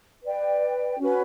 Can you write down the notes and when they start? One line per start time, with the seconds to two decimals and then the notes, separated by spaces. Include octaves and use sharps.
0.23 B4 D5 G5
0.98 C#4 F#4 B4